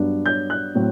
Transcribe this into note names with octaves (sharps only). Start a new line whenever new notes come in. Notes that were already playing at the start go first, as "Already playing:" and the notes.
Already playing: G2 F#3 B3 D4
G6
F#6
A2 F#3 C4